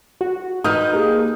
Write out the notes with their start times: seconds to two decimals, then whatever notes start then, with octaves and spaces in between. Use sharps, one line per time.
0.21 F#4
0.64 D#4 B4 D#6 F6 G6
0.93 A#3 G4 G#4